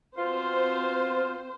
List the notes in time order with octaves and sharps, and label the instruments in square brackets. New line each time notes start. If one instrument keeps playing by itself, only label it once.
[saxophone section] B2 F4 [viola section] C4 C5